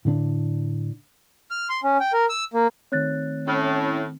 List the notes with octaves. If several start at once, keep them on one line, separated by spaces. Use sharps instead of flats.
A2 D3 D4
F6
C6
C#4
G5
A#4
E6
A#3
D#3 A3 C4 C#5 F#6 A6
A2 C#4